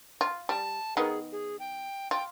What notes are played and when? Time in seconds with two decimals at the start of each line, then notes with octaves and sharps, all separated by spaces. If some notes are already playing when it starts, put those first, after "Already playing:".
0.21 F4
0.49 G3 A5
0.97 D#3 B3 D#4 G#4
1.32 G#4
1.60 G5
2.11 F4 G5